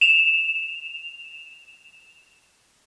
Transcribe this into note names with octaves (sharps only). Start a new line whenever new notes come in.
E7 F7